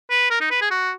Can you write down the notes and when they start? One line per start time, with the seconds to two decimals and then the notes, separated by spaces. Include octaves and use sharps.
0.10 B4
0.30 A#4
0.41 D#4
0.51 B4
0.61 G#4
0.71 F#4